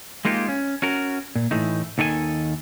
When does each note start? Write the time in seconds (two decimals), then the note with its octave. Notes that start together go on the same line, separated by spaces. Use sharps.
0.25 G#3 A#3 D#4 F4 G4
0.48 C#4
0.82 C#4 F#4 A#4
1.35 A#2
1.51 A2 E3 A3 D#4
1.98 D#2 D#3 A4 D5 G#5